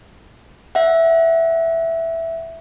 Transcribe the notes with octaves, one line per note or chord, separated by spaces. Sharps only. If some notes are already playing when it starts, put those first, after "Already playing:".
E5 F#5